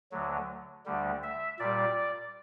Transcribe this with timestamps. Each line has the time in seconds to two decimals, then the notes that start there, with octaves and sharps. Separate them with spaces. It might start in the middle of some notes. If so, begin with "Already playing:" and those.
0.11 D2 D3 F#3
0.86 D2 D3 G3
1.23 E5
1.59 A#2 G3 D5